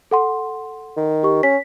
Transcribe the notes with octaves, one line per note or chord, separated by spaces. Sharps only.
A4 F#5 C6
D#3
G4 C#6
C#4 B6